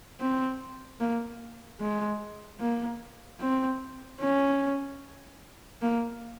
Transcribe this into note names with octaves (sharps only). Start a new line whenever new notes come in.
C4
A#3
G#3
A#3
C4
C#4
A#3